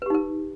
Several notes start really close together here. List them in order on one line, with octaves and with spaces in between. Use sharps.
B4 G4 D#4 A#4